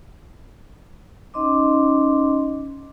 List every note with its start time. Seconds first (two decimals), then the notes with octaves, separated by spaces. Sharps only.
1.34 C#4 D#4 D#5 C6 D6